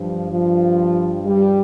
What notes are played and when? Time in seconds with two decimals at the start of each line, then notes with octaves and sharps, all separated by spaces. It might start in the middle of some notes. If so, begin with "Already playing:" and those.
Already playing: G2 F3
0.31 F3
1.26 G3